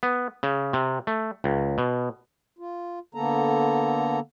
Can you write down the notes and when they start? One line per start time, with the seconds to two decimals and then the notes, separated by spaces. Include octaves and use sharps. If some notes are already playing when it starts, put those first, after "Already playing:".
0.03 B3
0.43 C#3
0.73 C3
1.07 A3
1.44 C#2
1.78 B2
2.59 F4
3.15 D3 A#3 B3 A4 A#5